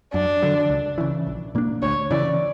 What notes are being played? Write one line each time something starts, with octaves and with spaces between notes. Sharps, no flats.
F#2 D4
D3 F#3
C#2
C#3 E3
A#1
A#2 A#3 D4
D2 C#5
C#3 E3 D5